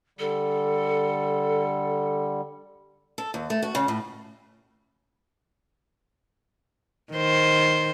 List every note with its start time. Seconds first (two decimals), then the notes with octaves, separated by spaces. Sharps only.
0.19 D3 G3 A4
3.18 A4
3.34 D#2
3.50 A3
3.62 F#4
3.75 C#3
3.88 A2
7.13 D#3 C5